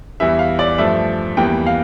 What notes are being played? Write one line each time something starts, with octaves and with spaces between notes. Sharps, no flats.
E2 E3 G3 E5
F5
D5
G2 F3 A3 E5
E2 E3 G3 A#3 G5
F5